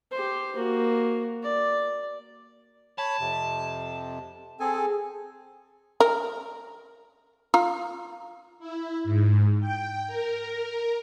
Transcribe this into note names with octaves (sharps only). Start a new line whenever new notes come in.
G4 C5
A#3 F#4
D5
C#5 A5 B5
F2 C3
C4 G#4 A4 G#5
A#4
F4 A#5
E4
G#2
G5
A#4